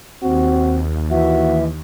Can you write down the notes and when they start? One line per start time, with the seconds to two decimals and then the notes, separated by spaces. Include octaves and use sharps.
0.22 D#2 C4 F#4
1.11 E3 F#4 E5